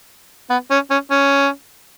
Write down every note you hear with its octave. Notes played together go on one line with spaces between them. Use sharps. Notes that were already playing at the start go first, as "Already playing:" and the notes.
B3
C#4
C#4
C#4